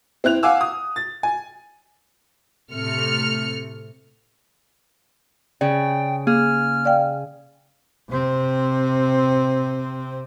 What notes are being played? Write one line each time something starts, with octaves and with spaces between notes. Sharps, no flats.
C4 E4 F#6 F7
F5 F#5 G#5 D6 E6
D#6
A6
G#5
A2 C3 A3 F6 C#7
C#3 D5 G5
A#3 G#4 F6
D5 F5 G5
C3 C4